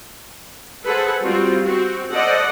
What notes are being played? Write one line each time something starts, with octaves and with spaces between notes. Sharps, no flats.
G#4 A4 B4 C5 F#5
G3 C4 F4 F#4
C4 F#4
A4 C5 D5 D#5 F#5